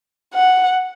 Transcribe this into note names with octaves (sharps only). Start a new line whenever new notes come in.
F#5